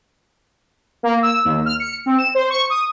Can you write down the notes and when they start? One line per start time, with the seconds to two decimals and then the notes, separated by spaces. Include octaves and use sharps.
1.03 A#3
1.22 E6
1.45 D#2
1.66 F6
1.80 C#7
2.06 C4
2.18 E7
2.35 C5
2.50 C#6
2.70 D#6